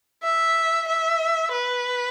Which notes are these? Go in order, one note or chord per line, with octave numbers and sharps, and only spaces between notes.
E5
E5
B4